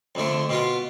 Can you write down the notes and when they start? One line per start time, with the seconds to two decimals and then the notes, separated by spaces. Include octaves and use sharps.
0.15 F2 D3 A3
0.49 B2 B3 F4